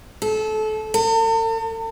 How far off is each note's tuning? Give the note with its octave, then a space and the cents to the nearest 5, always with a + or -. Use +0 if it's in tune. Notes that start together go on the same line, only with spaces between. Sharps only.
A4 -25
A4 +45